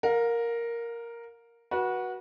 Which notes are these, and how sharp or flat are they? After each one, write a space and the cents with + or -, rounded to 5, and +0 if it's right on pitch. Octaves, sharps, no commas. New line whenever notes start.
A#4 +0 F5 +35
F#4 +0 B4 -30